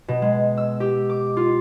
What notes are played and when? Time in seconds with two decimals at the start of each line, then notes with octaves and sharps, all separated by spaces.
0.08 B2
0.22 G#3
0.57 E6
0.80 G4
1.09 D6
1.37 F4